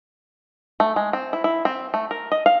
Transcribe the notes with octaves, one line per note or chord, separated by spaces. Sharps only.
A3
G#3
C4
E4
E4
C4
A3
A#4
D#5
F5